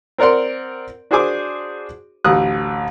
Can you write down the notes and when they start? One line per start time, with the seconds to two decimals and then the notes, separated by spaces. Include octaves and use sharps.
0.18 C4 A#4 D5 F#5 C6
1.11 D4 F#4 G#4 C5 G#5 D6
2.24 A1 D2 D#6 F#6